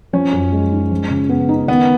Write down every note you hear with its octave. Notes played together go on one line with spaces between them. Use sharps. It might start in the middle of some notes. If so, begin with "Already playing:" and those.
F3 C#4
F#2
G#3
D#4
F3
C#3
B3
D#4
D#3 B3